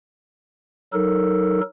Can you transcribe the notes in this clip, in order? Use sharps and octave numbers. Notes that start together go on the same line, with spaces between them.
F#3 D#4 A4 A#4